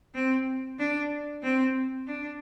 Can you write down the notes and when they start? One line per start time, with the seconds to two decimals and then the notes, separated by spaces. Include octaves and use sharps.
0.14 C4
0.79 D4
1.43 C4
2.07 D4